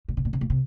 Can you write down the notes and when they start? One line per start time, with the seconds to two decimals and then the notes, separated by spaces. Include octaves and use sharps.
0.09 A#2
0.17 C3
0.25 A#2
0.33 C3
0.41 A#2
0.50 C3